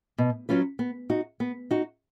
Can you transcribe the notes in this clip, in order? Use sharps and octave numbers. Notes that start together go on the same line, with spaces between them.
B2
F#3 C#4 F4 B4
B3
D#4 F#4
B3
D#4 F#4